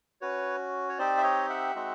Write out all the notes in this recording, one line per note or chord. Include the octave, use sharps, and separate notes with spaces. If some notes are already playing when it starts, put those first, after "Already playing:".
C#4 F#4 B4 C#5
C#5
C4 D#4 G4 C5 D5
E5
C#5 D#5
E5 F#5
G#3 C4 D#4 F#4